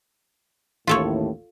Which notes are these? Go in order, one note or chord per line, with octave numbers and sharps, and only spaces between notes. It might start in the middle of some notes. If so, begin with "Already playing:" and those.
A1 D#2 A2 F4 A4 C#5